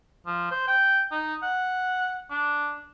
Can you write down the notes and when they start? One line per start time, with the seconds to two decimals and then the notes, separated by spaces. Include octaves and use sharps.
0.26 F3
0.51 C5
0.68 G5
1.12 D#4
1.43 F#5
2.31 D4